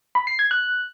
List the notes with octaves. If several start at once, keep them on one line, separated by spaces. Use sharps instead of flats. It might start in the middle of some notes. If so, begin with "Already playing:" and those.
B5
C7
G#6
F#6